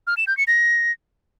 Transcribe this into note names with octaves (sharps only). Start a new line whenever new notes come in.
F6
E7
G6
C#7
A#6